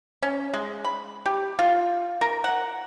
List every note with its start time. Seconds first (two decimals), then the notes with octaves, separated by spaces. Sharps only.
0.22 C#4
0.54 G#3
0.84 B5
1.26 G4
1.59 F4
2.21 A#4
2.44 F#5